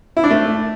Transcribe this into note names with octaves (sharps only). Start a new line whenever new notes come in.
E4
D4
A3